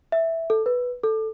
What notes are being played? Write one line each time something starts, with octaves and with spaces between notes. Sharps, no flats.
E5
A4
B4
A4